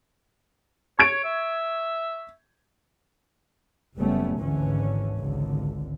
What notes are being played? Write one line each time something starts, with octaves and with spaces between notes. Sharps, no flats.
C#5 C#6 G#6 D7
E5
F#1 G3 A3 B3 C#4
G#1 D2 G#2 D3 E3 C#4
G#1 C#2 D3